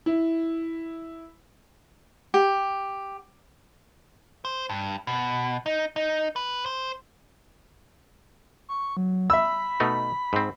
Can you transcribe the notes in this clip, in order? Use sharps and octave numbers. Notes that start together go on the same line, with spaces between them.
E4
G4
C5
G2
B2
D#4
D#4
B4
C5
C#6
F#3
E5 B5 E6
B2 A3 D#4
G#2 C4